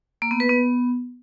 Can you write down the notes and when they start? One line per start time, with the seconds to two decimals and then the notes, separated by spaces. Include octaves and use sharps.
0.22 A#3
0.31 B3
0.40 B4
0.49 B3